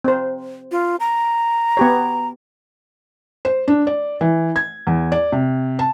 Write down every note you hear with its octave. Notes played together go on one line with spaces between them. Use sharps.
C4 C5
F4
A#5
B3 G4 C#5
C5
D4
D5
E3
G#6
E2
D5
C3
A5